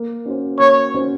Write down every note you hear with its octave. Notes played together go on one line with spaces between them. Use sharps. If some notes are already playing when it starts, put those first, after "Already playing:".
Already playing: A#3
C#4 F#4 C5
A#3 C#5
C#4 F#4 C5